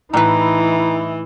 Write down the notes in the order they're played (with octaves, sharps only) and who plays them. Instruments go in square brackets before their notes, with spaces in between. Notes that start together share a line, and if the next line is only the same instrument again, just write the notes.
[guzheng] A2 B4 [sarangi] E3 [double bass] D#4 E4 [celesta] A#5